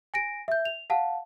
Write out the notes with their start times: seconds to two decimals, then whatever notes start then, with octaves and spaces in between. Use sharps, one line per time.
0.14 G#5 A#6 D7
0.48 E5 G6
0.65 F7
0.90 F5 F#5 A5